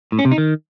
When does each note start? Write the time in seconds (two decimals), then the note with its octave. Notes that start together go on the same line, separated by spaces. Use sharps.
0.12 A2
0.19 C#4
0.25 C3
0.31 D#4
0.38 D#3